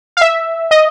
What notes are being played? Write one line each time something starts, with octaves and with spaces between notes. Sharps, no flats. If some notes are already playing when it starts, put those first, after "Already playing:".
F5
E5
D#5